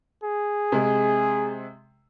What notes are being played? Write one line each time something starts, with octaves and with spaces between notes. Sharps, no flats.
G#4
C3 G#3